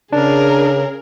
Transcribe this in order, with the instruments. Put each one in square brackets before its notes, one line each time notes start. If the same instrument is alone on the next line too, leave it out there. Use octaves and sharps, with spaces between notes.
[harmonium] C#3 [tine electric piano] D4 [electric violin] G#4 A#4